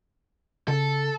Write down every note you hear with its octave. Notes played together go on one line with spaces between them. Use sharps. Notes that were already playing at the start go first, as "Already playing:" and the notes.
C#3 A4